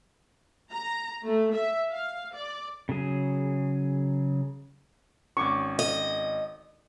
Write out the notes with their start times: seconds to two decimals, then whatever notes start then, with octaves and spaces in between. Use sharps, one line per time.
0.72 A#5
1.26 A3
1.55 E5
1.92 F5
2.33 D5
2.89 C#3 F#3 G#4
5.37 G#1 C#4 C#6 D6
5.79 D#5